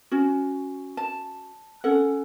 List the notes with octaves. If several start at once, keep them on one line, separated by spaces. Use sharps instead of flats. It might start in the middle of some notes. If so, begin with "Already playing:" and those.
C#4 F#4
A5
C#4 A4 F#5